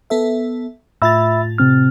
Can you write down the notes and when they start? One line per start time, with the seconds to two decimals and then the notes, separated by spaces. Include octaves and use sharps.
0.10 B3 A4 E5
1.02 A2 F4 E5 B5 E6 A6
1.58 C3 C4 F6